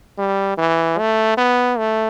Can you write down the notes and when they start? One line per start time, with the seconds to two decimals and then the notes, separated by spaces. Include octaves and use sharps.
0.18 G3
0.58 E3
0.98 A3
1.37 B3
1.78 A3